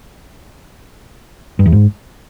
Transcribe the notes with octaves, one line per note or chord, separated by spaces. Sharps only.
G2
E2
G#2